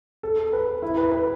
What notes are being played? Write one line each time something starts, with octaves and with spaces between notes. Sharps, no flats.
A4
B4
E4
B4
B4